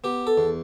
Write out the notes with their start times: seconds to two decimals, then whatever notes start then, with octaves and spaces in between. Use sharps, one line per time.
0.04 B3 G4
0.27 A4
0.38 E2